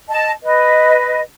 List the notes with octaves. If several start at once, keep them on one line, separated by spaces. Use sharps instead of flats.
D#5 A5
B4 D#5